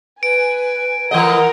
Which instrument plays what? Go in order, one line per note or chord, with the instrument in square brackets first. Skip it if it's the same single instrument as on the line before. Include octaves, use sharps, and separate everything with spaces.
[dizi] B4 [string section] G#5 [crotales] D7
[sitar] E3 A3 D#5 [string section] A#4 [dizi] F#5